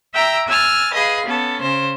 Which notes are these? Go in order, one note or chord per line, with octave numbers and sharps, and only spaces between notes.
E5 G5 A#5 E6
G#5 E6 F6 A6
G#4 B4 D#5 F5
B3 C#4 A4
C#3 C5